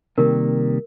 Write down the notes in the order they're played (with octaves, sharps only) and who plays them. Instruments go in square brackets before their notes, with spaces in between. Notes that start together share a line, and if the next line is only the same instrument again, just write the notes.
[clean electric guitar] C3 D#3 G3 A#3 [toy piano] A#4